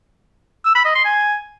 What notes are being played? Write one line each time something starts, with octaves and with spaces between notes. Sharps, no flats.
E6
B5
D#5
C6
G#5